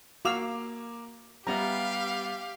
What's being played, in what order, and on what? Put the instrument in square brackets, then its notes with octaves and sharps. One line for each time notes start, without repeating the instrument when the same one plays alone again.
[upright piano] A#3 D6 F7 [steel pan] F#4 F5 E6
[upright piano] G3 B3 E5 [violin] G4 F5 [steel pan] A#5